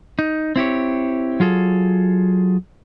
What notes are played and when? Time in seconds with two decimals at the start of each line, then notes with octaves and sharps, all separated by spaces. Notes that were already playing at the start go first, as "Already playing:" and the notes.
0.19 D#4
0.56 C4 E4 G4 C#5
1.40 F#3 F4 G#4 A4